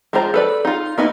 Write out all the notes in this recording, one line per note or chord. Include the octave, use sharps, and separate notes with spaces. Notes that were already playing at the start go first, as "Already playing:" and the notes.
G#3 D4 F4 C5 A#5
A4 B4 D5
D#4 F4
A#3 B3 D#4 E4